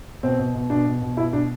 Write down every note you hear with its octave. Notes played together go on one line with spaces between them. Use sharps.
B2 C4
B2
B2
B2 D4
B2
B2
B2 E4
B2 D4